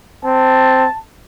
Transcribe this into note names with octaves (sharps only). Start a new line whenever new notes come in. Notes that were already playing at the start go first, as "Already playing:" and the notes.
C4 A5